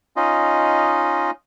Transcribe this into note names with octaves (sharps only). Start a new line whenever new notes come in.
C#4 D#4 F4 D#5